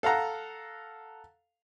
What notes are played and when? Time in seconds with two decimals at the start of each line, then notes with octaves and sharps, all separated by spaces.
0.03 A4 F5 F#5 A#5